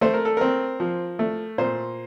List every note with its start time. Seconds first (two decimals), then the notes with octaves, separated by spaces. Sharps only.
0.01 A3 C5
0.13 A#4
0.25 A4
0.37 C4 A#4
0.80 F3
1.19 A3
1.58 A#2 C5